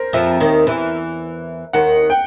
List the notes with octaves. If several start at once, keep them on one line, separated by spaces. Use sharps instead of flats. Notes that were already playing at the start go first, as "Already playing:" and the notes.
Already playing: A#4 C5
F2 F3 E5
D#2 D#3
E2 E3
D#2 D#3 F#5
G5